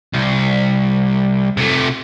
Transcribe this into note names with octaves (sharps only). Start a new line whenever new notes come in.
C2
C3 A3